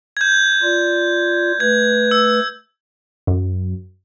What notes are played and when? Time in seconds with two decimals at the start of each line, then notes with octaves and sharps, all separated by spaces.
0.17 G6 G#6
0.63 F4 D5
1.60 A3 B4 G#6
2.11 E6
3.27 F#2